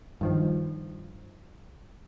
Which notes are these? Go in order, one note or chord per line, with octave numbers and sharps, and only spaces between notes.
G2 D#3 F3